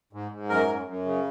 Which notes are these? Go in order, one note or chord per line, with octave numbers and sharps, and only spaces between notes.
G#2
G#2
F#2 A#4
F#2
F#2
C#3